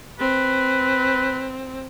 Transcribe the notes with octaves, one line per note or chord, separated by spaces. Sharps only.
C4 B4